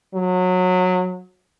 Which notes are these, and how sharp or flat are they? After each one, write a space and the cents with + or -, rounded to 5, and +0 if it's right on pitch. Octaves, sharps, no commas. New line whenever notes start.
F#3 -20